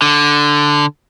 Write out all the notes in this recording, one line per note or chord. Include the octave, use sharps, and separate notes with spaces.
D3